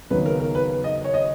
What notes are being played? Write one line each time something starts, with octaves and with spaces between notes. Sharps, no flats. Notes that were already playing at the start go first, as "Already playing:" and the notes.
D#2 C#3 F#3 B3 D#4 B4
A#4
A#4
B4
D#5
C#5
D#5